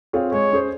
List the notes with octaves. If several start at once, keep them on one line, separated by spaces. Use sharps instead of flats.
C4 F4 G#4 C#5
G#3 C#5
C#4 G#4 C5